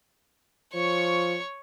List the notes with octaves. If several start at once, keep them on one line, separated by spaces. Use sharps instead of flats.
F3 C#5 C#6